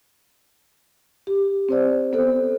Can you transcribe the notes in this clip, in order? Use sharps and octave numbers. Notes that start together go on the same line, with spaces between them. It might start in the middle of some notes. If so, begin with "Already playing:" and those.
G4
C4 C5 D5
B3 A4 C5